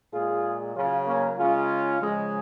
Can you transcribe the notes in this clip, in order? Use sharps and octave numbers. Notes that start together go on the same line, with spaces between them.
A#2 G#3 F4 G#4
C#3 F#3 C#4 F4
A#3 C#4
C#3 G#3 C#4 F4
C#3 F3 G#3